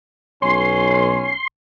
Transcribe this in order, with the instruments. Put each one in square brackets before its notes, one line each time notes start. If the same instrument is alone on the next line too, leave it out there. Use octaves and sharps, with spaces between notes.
[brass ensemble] B1 [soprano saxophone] C#4 [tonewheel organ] C6